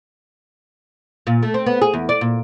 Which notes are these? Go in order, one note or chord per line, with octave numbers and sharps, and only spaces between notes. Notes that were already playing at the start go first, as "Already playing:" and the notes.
A#2
A3
C4
B3
G#4
E2
D5
A#2